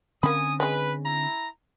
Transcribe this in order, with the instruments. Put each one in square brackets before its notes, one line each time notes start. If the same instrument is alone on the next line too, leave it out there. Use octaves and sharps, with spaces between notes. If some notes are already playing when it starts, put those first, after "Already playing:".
[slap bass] D3 C4 C#4 [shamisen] A#3 B5 [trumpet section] G#5 D#6
[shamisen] C#3 G#3 [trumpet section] B4
[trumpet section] E4 A#5